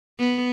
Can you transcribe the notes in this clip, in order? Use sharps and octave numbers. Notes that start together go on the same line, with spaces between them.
B3